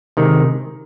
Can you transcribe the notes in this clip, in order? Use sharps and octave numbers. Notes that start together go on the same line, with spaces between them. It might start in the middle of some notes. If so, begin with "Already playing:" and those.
C3 D#3 G#3 D#4